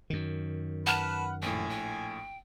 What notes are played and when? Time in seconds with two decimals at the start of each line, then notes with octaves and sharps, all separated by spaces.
0.10 F#2 D#3
0.87 B4 F#5 A5 F6
1.42 A#1 A2 G5 G#5
1.69 G5